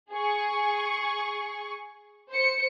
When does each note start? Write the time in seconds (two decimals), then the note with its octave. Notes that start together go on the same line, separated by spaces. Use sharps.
0.12 G#4 C#6
2.32 C5 C#7